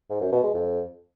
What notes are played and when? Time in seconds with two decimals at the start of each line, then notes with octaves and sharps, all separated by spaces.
0.10 G#2
0.21 F#2
0.32 B2
0.43 G#3
0.54 F2